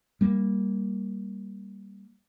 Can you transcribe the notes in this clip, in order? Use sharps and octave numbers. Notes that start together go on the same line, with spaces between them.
G3 A#3